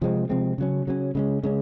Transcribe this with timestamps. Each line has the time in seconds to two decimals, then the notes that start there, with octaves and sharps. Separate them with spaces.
0.01 C3 F3 G#3 C4
0.29 C3 F3 G#3 C4
0.58 C#3 F#3 C#4
0.87 C#3 F#3 C#4
1.15 C#3 G#3 C#4
1.43 C#3 G#3 C#4